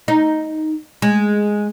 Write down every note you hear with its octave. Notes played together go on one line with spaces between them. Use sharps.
D#4
G#3